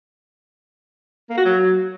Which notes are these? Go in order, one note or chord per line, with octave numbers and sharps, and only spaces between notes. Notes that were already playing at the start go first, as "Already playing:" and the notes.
A#3
F#4
F#3